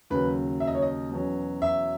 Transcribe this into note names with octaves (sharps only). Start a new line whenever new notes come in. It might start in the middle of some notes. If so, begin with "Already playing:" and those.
D#2 C#3 F#3 B4
E5
D#5
C#5
D#5
E2 B2 F#3 C#4
E5